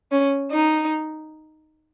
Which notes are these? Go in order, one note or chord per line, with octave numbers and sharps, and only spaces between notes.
C#4
D#4